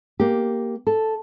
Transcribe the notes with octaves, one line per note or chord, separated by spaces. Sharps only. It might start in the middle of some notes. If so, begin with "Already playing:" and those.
A#3 G4
A4